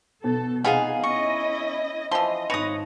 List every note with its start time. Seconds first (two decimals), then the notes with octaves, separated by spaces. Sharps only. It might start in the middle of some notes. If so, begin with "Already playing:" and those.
0.24 B2 A4
0.64 C3 B3 D#4 F4 G#4 F5 G#5
1.04 C#4 E4 D#5 C#6
2.11 E3 F3 D#5 C6
2.50 G#1 B4 C#5 D#6 A#6 F7